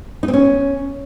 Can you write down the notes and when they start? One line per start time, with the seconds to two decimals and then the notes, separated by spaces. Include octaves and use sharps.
0.23 D#4
0.28 C4
0.33 C#4